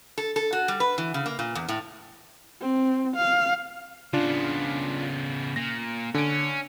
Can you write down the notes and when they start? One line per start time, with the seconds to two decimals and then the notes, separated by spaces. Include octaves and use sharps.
0.18 A4
0.36 A4
0.53 F#4
0.68 G3
0.80 B4
0.98 E3
1.14 C#3
1.26 A#3
1.39 A#2
1.55 E2
1.69 A2
2.61 C4
3.16 F5
4.13 C#3 B3 D4 F4
5.56 A#2 A#6
6.14 D3 C#4 D7